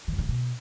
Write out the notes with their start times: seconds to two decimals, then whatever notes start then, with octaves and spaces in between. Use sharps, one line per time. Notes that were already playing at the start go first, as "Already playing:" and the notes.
0.08 D#3
0.13 F2
0.18 D3
0.23 C3
0.29 B2